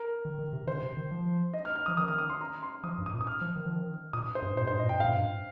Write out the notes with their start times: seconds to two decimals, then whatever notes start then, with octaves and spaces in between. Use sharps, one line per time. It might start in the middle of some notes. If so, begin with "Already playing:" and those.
Already playing: A#4
0.25 D#3
0.39 D#3
0.53 C3
0.67 D#3 C5
0.83 C3
0.97 D#3
1.11 F3
1.54 D#5
1.65 F6
1.75 F6
1.86 F3 D#6
1.97 D#3 D#6
2.08 F6
2.18 D#6
2.30 C6
2.41 A#5
2.63 C6
2.84 F3 D#6
2.98 G2
3.06 D#6
3.13 A#2
3.21 D#6
3.27 F6
3.41 F3
3.56 D#3
3.66 F3
3.76 D#3
4.13 A#2 D#6
4.35 C5
4.42 G2
4.55 A#2 C5
4.67 G2 C5
4.79 A#2 D#5
4.89 G5
4.92 G2
5.00 A#2 F5
5.16 G2